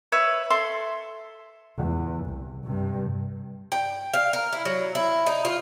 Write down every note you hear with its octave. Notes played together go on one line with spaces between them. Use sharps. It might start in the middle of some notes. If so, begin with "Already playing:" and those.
B4 C#5 E5
A4 E5 C6
E2
C2
G2 C3
G5
F5
A#4
E4
F#3
E4
D#4
F4